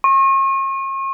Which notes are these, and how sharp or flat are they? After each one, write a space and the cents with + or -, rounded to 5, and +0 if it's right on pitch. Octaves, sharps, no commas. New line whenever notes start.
C#6 -40